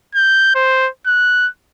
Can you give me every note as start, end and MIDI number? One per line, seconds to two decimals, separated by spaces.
0.15 0.54 91
0.55 0.89 72
1.06 1.48 90